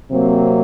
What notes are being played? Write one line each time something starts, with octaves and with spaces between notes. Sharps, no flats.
C3 F#3 A#3 C4